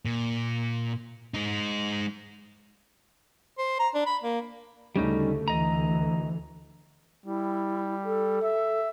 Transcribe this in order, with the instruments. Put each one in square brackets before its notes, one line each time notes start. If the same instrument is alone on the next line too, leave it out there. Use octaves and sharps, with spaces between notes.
[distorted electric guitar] A#2
G#3 D#4
[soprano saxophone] C5
A#5
D4
B5
A#3
[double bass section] D2 C#3 A3 [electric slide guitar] G3 C#4 D#4
[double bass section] D2 E3 [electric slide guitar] D#5 A#5
[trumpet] G3 [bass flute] E4
[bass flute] A4
[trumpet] E5